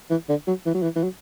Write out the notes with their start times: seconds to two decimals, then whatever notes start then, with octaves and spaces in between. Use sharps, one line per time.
0.10 E3
0.29 D3
0.47 F#3
0.66 E3
0.75 F#3
0.82 E3
0.96 E3
1.03 F#3